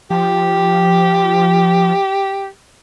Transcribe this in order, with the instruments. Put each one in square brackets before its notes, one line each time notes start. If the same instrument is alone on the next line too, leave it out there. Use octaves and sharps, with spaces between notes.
[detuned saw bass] F3 [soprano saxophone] G4